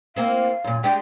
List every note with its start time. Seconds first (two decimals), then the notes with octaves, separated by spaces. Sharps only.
0.16 A#3 C4 E4 F5
0.64 F#2 A#2
0.84 G#3 D4 G4 G5